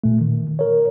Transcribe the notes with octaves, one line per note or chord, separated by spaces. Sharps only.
A#2 A3
D#3
A#4 C#5